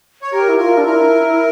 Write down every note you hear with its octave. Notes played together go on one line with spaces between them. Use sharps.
C#5
G4 A#4
E4
F4 A#4
D4
E4 A#4